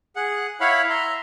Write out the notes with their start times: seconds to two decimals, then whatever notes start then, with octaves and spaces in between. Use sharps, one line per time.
0.16 G#4 F#5
0.61 E4 C#5 F5 F#5 B5
0.90 E5 A#5 C6